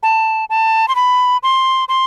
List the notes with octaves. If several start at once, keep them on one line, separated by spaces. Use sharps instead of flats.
A5
A5
C6
B5
C6
C6